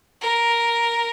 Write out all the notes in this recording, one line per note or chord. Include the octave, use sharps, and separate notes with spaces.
A#4